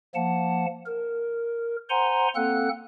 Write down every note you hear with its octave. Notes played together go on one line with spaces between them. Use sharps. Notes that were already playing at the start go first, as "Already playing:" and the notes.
F3 A#3 F#5 A5
A#4
C5 F#5 G#5 A#5 C6
A#3 C4 A4 F#5 F#6